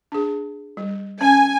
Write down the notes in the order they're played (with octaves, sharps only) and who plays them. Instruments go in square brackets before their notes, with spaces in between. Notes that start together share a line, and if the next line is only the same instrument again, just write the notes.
[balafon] D4 G#4
G3
[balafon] C#4 [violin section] G#5